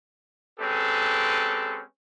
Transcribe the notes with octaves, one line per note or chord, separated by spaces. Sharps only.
G#3 C4 C#4 G4 A4 B4